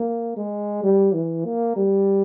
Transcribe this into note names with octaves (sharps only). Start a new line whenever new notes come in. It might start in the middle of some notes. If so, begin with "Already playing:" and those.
Already playing: A#3
G#3
G3
E3
A#3
G3